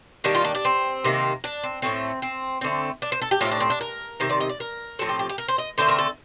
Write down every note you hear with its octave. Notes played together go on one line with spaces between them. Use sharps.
D#3 G3 A#3 D4
F4
D4
D4
C4
C3 D#3 A#3
D4
C4
A2 F3 A3 C4
C4
D3 A3 C4
D4
C5
A4
G4
A2 A3 C4 F4
D4
C4
D4
A#4
C3 D#3 C5
D5
D#5
D5
A#4
A2 F3 C4 A4
G4
G4
G4
A#4
C5
D#5
D3 A3 C4 C5
A#4
A4